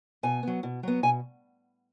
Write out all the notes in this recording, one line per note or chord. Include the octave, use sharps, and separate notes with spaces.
B2 G#5
F#3 B3
B2
F#3 B3
B2 G#5